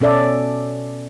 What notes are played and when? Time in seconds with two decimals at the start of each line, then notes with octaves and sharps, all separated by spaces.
0.01 B2 C#4 A4 D5 E5